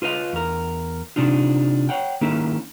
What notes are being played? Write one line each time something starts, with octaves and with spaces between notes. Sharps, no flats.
F4 B4 D#5 F5
E2 A#4
C3 D4 D#4 F4
C#5 F#5 G5
D#3 A#3 C#4 E4